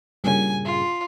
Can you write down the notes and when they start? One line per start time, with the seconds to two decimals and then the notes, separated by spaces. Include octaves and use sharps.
0.24 G2 A#2 C#3 G#5
0.65 F4